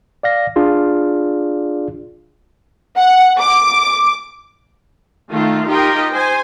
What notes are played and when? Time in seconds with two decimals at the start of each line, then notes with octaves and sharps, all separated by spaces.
0.23 D5 F5 A#6
0.56 D4 F4 G#4 D5
2.97 F#5
3.38 D6
5.31 D#3 A3 F4
5.68 D#4 F4 G4 A#4 D#5 G5
6.11 C5 G#5